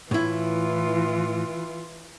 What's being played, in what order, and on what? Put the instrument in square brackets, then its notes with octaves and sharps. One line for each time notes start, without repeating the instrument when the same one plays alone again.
[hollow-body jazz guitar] A2 E4 [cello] E3 F4